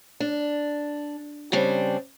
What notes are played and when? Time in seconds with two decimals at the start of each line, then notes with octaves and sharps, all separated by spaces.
0.20 D4
1.52 C#3 G3 C4 D4